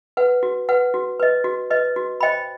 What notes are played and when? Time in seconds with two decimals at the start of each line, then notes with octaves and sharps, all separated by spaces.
0.17 B4 F#5
0.43 F#4
0.69 B4 F#5
0.94 F#4
1.20 B4 D#5
1.44 F#4
1.71 B4 D#5
1.96 F#4
2.21 C5 D#5 G5 B5